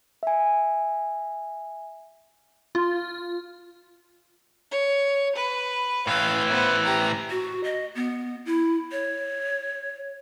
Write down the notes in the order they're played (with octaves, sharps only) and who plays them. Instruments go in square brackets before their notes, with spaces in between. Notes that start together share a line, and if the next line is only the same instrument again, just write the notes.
[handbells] E5 G#5
[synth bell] F4
[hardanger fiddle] C#5
B4
[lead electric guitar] A2 E3 [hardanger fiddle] F5
[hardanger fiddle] B3 C5
G4 A#5
[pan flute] F#4
D#5
B3
E4
C#5